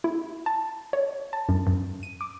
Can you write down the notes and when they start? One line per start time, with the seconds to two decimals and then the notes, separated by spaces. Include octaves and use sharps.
0.04 E4
0.46 A5
0.93 C#5
1.33 A5
1.49 F#2
1.67 F#2
2.03 D#7
2.21 D6